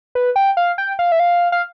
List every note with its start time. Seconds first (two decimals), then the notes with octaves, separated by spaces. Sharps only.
0.15 B4
0.36 G5
0.57 F5
0.78 G5
0.99 F5
1.12 E5
1.20 F5
1.52 F5